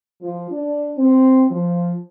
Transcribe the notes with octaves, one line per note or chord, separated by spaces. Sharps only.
F3
D4
C4
F3